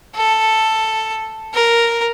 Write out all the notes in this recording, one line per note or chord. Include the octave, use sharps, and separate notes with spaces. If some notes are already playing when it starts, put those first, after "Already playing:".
A4
A#4